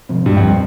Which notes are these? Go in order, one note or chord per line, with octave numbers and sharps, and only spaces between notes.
C3 F3 C4
G2 A#2
F2
G3 C4